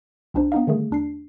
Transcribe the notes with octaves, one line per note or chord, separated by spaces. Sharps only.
C2 C4 D4 D#4 C5
B3 C4 D4 D#4 D#5 F5
D3 D#3 G3 A3 G#4
E2 D4 C7